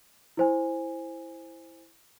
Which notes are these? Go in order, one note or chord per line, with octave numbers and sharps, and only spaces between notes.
E4 C5 G#5